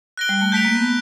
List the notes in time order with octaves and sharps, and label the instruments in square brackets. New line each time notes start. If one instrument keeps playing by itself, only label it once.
[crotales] F#6 A#6 D7 G7
[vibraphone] G3
A3
[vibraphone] A3 [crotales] G6 B6 D7 F7
[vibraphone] A#3
B3